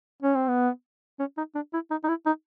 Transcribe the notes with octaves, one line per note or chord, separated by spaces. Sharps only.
C#4
C4
B3
C#4
D#4
D4
E4
D#4
D#4
E4
D#4